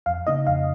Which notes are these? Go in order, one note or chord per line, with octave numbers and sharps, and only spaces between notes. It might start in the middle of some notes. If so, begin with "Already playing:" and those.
F2 F5
C#3 A#3 D#4 D#5
F2 F5